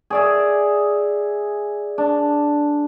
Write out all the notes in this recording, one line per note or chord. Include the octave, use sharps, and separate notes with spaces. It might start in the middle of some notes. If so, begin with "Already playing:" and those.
G#4 D5 E5
D4